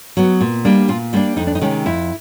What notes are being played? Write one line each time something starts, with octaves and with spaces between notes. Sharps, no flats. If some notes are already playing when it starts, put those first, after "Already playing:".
F#3 B3
A#2
G3 A#3 D4
A#2 F4
G3 A#3 D4 E4
F2 D#4
D4
D#4
C3 D#3 G#3 C#4
F2 E4